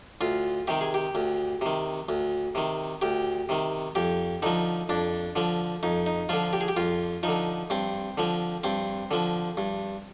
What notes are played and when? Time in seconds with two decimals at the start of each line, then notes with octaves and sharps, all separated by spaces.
0.21 D2 F4
0.68 C3 D#3 G4
0.81 G#4
0.94 G4
1.15 D2
1.61 C3 D#3
2.09 D2
2.55 C3 D#3
3.02 D2 G4
3.49 C3 D#3
3.95 F2 G4
4.42 D3 F3 D#4
4.89 F2 D4
5.36 D3 F3
5.83 F2 D#4
6.06 D#4
6.29 D3 F3 F4
6.53 G4
6.61 G#4
6.68 G4
6.77 F2 F4
7.23 D3 F3 D#4
7.70 G2 C4
8.18 D3 F3
8.64 G2 C4
9.11 D3 F3
9.57 G2